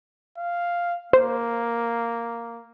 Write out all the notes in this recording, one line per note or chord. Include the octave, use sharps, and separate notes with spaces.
F5
A#3 C5